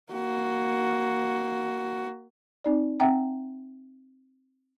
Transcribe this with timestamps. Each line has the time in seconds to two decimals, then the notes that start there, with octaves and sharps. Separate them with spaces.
0.13 A#3 F#4
2.64 C4 D#4 D5
3.00 C4 E5 F#5 G5 A#5